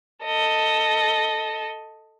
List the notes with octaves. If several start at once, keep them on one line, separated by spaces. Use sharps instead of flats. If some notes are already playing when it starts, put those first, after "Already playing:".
A4 D#5